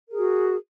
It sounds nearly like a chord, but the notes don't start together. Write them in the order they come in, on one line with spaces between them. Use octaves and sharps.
A#4 G#4 F#4